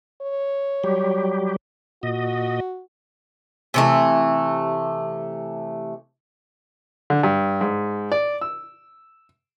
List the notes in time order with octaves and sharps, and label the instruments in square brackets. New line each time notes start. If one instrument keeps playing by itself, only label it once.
[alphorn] C#5
[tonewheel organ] F#3 G3 G4
[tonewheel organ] A#2 D#5 [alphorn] F#4
[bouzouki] C3 E3 A3
[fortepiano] D3
G2
G#2
D5
E6